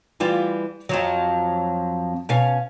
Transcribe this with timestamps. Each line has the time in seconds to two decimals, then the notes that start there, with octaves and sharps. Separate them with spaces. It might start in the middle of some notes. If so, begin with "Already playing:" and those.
0.20 E3 G3 F4
0.89 F2 F3 F#3
2.29 B2 C#4 F5